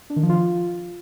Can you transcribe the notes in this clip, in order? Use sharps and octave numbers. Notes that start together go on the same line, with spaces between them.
D4
D#3
F3
F4